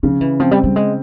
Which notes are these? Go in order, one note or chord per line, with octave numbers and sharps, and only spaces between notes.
C#3 F3
E3
F3 C4
G3
G3
G#3